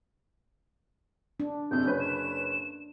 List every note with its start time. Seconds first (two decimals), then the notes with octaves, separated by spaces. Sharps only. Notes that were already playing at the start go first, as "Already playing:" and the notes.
1.40 D4
1.71 F#1 C3 G6
1.85 F#1 C#4 B4
2.00 E7